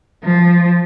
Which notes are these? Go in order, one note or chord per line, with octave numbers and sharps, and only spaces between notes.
F3